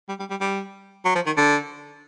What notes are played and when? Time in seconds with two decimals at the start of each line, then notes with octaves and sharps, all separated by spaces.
0.09 G3
0.20 G3
0.30 G3
0.41 G3
1.05 F#3
1.15 F3
1.26 D#3
1.37 D3